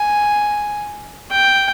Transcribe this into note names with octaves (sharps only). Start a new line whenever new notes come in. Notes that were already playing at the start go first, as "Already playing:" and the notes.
Already playing: G#5
G5